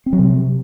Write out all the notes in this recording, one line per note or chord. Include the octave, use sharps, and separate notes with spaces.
C4
F#3
C3